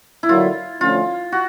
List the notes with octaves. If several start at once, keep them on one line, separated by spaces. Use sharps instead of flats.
E4
D3 F#3 A#3 F4
D3 F3 A3 C#4 F4
F#4